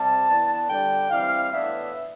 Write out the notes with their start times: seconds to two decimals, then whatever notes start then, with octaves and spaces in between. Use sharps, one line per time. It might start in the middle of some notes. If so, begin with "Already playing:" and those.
Already playing: C3 G3 A5
0.26 E3 B3 D4
0.68 D3 G3 D4 G5
1.09 E3 G3 C4 F5
1.51 A2 E3 B3 D4 E5